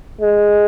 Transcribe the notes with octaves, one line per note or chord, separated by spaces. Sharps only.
G#3